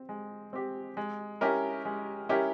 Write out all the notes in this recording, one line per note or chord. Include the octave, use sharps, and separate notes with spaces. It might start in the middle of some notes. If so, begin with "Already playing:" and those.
Already playing: C4
G#3
C4 G4
G#3
C#4 E4 G4 A#4
G#3
C#4 E4 G4 A#4